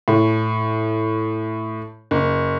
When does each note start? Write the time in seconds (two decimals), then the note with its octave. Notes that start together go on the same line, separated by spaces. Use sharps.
0.08 A2
2.11 F#1